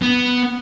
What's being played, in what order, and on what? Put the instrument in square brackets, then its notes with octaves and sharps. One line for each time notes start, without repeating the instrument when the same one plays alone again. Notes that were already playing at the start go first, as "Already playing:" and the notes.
[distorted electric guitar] B3